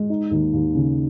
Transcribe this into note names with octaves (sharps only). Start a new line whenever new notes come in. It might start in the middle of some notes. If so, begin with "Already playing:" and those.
Already playing: G#3
D#4
D#2
D#2
C#3